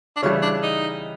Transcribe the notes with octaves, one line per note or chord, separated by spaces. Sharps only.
D4
C#3 E3 G3 C#4
D4
D#4